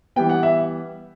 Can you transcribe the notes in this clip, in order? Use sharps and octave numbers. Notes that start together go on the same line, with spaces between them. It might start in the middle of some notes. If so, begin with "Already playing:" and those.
E3 G3 B3 G5
F#5
E5